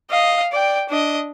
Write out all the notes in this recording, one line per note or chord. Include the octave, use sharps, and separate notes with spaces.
D#5 F5
D5 G5
D4 D#5